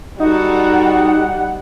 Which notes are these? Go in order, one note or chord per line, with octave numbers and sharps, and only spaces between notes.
G3 D#4 F#4 A4 F#5